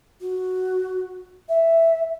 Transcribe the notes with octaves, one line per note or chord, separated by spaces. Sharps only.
F#4
E5